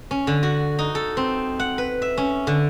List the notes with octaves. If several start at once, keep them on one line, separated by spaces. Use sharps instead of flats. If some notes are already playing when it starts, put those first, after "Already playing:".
C#4
D3
F#4
D#4
A4
C4
F#5
B4
E5
C#4
D3